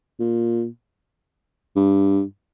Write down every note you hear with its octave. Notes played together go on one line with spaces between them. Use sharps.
A#2
G2